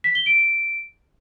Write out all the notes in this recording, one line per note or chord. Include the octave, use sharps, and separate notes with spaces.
B6
G7
D7